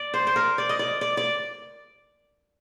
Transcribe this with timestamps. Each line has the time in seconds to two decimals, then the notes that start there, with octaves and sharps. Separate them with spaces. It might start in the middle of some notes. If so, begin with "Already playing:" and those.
Already playing: D5
0.14 C5
0.27 C5
0.36 A#4
0.58 D5
0.69 D#5
0.79 D5
1.01 D5
1.17 D5